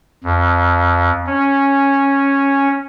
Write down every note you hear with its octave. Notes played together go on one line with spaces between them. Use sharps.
F2
C#4